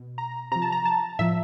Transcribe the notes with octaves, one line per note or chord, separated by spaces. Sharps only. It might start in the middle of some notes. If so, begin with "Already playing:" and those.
Already playing: B2
A#5
C3 F3 A#5
A5
A#5
A5
A2 F3 E5